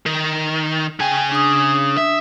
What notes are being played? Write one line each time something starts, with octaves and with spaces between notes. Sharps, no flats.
D#3
C#3 G5 G#5
D4 D#6
E5